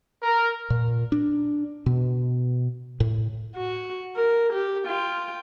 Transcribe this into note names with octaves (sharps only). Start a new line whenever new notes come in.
A#4
A#2
D4
B2
A2
F#4
A#4
G4
F4 G5